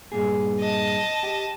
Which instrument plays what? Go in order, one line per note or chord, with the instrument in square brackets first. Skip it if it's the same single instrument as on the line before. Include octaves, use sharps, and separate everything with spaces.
[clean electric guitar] G2 A#2 G#4
[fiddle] D#5 A5
[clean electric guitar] G4